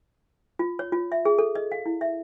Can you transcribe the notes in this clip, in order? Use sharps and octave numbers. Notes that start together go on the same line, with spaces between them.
F4
C#5
F4
E5
G#4
A4
D#5
F5
E4
E5